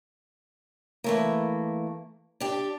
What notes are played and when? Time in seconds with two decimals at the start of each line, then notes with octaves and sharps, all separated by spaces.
1.04 E3 A3 A#3
2.40 D4 G4